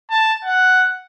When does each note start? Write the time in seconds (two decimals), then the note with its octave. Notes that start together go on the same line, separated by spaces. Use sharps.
0.10 A5
0.45 F#5